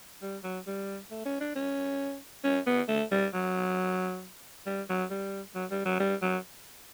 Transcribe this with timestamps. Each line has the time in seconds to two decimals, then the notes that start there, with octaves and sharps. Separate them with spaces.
0.22 G3
0.44 F#3
0.67 G3
1.11 A3
1.26 C#4
1.41 D4
1.56 C#4
2.44 C#4
2.67 B3
2.88 A3
3.12 G3
3.34 F#3
4.66 G3
4.89 F#3
5.11 G3
5.55 F#3
5.71 G3
5.85 F#3
6.00 G3
6.22 F#3